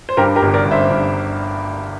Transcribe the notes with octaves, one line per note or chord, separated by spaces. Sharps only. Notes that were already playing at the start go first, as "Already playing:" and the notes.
C5
G2 G4 A#4
G4 A#4
G1
A#4 D5
G2
C5 E5
G2